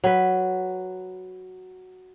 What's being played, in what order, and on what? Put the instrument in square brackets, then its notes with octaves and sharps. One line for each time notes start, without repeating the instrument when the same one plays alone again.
[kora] F#3 B4